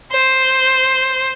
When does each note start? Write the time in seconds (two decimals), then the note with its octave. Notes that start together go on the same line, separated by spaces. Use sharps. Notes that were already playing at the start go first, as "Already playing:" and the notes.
0.12 C5